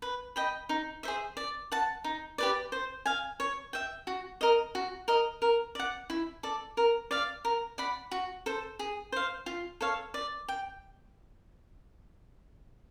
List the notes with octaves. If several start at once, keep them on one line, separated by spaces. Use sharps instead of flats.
B4
D#5 G5 B5
D#4
G#4 C5 E5
D5
F#5 A5
D#4
G4 B4 D5
C5
F5 G#5
C#5
E5 G5
F#4
A#4 D#5
F#4
A#4 D#5
A#4
D5 F#5
E4
A4 D5
A#4
D5 F5
A#4
D5 F#5 B5
F#4
A4 C5
G#4
C5 F5
F4
A4 C#5 F5
D5
G5